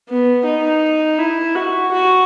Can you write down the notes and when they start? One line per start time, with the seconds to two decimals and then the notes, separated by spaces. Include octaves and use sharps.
0.10 B3
0.46 D#4
1.19 E4
1.55 F#4
1.92 F#4